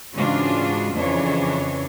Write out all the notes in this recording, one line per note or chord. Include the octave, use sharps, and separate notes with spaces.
G#2 C#3 E3 D4 F4 F#4
F2 C#3 E3 D4 C#5